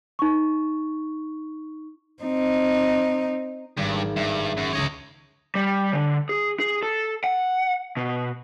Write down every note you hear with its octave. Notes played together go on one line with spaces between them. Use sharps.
D#4 C#6
C4 D#4
G#1 G2
G2 E5
F#2
C#2 C#4 C#5 D#5
G3
D3
G#4
G#4
A4
F#5
B2